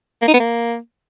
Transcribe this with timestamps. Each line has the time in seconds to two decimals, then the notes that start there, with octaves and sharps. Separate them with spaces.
0.22 A#3
0.28 D#4
0.34 B3
0.40 A#3